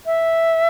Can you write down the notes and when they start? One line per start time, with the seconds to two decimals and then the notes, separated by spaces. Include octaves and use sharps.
0.06 E5